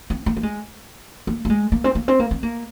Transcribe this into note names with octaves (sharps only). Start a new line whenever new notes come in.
C4
A#3
A#3
G#3
A#3
A#3
G#3
A#3
C4
A#3
C4
A#3
C4
A#3